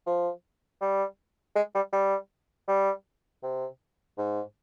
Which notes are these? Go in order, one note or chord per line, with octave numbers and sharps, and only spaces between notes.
F3
G3
G#3
G3
G3
G3
C3
G#2